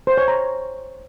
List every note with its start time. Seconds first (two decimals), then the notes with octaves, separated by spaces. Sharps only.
0.07 C5
0.17 C#5
0.28 A#5